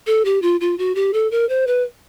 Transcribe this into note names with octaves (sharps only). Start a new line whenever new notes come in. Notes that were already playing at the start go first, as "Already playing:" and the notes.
A4
G4
F4
F4
F#4
G4
A4
A#4
C5
B4